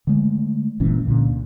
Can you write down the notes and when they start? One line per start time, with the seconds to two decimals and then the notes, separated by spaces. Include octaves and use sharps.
0.07 D3 G#3 A3
0.80 G1 A#2 E3 C#4
1.07 C#2 A#2 D3